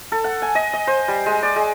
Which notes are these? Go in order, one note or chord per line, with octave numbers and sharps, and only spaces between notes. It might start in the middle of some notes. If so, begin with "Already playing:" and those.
A4
F#5
G#5
D#5
D#5
C5
G3
G#3
D5
G#3